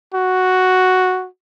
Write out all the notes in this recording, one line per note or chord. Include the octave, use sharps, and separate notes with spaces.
F#4